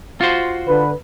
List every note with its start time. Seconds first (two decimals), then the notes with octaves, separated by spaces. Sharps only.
0.21 F4 F#4 C5
0.67 D3 B4